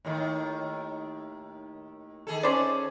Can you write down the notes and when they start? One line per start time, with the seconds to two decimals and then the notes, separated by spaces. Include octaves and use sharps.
0.05 D#2 A2 D#3
2.27 D#3 G#4 A4
2.43 C#4 C5 D5